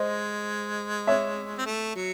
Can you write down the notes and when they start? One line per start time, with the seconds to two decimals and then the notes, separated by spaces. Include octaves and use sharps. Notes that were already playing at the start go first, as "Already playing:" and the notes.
Already playing: G#3 C5 D#5
1.07 C#5 E5
1.58 C4
1.66 A3
1.95 F#3